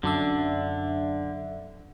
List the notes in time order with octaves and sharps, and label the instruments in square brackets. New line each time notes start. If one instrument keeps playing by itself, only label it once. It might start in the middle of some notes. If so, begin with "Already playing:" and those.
[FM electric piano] F#2 D4 E5 [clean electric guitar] D3